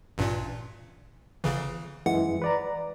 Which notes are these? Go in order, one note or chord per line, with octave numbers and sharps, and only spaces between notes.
A1 G2 A#2
G1 C#3 E3
F#2 E3 G#3 F#5
B4 D5 A#5